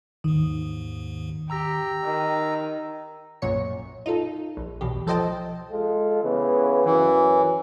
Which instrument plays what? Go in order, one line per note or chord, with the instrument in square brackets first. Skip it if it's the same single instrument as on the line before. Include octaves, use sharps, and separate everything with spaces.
[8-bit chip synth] D#2 G#2 [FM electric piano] D#3
[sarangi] G4 [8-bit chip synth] A#5 E6 A#6
[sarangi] D#3
[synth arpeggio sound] B1 F#2 A#2 C#5 C#7
D#4 F4 A4
A#1
B1 E2 B2 G4
F3 A4 C5 D#5 G5 A5
[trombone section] G#3 F4 A4
C#3 E3 B3
[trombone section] F#2 [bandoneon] E3